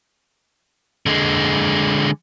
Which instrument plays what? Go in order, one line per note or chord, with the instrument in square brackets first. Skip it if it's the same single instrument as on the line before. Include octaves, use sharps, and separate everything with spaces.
[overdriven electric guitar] D3 G#3